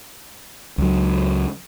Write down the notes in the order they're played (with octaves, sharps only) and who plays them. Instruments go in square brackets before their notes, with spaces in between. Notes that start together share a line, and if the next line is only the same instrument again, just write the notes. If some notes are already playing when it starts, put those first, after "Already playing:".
[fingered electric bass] C#2 F#3